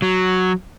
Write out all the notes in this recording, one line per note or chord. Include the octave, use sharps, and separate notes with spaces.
F#3